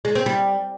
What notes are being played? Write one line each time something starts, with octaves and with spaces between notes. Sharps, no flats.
G#3
C4
G3